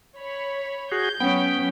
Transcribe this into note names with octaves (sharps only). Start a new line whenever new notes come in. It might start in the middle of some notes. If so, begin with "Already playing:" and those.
C#5 B5
F#4 G#4 G6
F#3 B3 C#4 G5